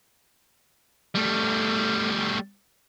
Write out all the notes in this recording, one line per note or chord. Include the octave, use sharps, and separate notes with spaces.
G3 A3